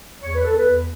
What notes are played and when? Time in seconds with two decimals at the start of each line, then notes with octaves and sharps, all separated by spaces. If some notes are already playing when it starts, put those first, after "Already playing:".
0.21 E2 C#5
0.33 B4
0.44 E2 A4
0.57 B4
0.65 E2